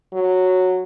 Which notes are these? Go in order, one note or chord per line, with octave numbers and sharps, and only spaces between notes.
F#3